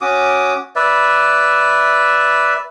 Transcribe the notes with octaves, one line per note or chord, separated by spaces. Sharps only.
C#4 F#4 D6 D#6
B4 D5 E5